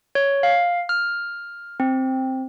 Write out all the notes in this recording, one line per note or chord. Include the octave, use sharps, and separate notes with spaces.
C#5
F5
F6
C4